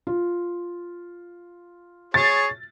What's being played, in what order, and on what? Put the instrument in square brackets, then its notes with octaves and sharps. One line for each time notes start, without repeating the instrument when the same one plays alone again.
[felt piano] F4
[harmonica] G#4 C#5 [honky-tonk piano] A6